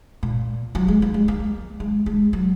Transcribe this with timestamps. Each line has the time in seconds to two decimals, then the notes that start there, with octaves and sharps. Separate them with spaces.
0.23 A#2
0.75 F#3
0.88 G#3
1.02 A#3
1.14 G#3
1.28 A#3
1.80 G#3
2.06 G#3
2.33 F#3